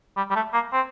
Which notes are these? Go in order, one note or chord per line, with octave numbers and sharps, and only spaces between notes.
G3
G3
A3
A#3
C4